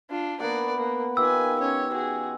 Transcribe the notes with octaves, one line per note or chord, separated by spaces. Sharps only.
D4 F4
A#3 B3 D5 F#5
A#3
D#3 F4 G4 B4 G#5 E6
C#4 C#5
F#4 G#4